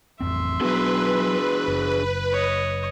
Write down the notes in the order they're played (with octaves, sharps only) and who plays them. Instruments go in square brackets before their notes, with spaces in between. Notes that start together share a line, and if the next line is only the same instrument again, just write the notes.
[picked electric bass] A1 F2 C4 [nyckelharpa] E5 C6
[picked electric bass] F#3 B3 [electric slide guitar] D4 F#4 G#4 [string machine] B4
[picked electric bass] F#1
[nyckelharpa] C#5 D#5